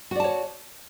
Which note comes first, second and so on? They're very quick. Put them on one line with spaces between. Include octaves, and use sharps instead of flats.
F#4 D5 A5 C#5